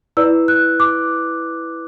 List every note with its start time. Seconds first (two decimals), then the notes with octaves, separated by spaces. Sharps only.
0.17 E4 B4 D5 E6
0.48 F#6
0.80 D6